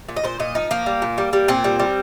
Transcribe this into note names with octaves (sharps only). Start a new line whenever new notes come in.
A#2
D#5
A#2 C5
A#2 D#5
F3 D#4
F3 A#3
G3
A#2
G3
G3
A#2 C4
G3
G3